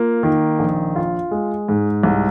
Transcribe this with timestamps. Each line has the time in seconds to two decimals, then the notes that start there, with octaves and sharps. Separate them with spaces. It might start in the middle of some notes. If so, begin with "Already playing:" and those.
Already playing: A#3 F4
0.23 D#3
0.59 A#1
0.96 F4
1.31 G#3
1.69 G#2
2.03 C2